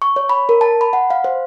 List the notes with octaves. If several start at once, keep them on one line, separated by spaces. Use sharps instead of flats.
C#6
C#5
B5
A#4
A5
B5
F#5
F5
C5